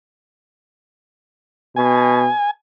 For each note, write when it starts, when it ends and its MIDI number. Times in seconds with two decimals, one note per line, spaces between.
1.76 2.28 47
1.76 2.51 80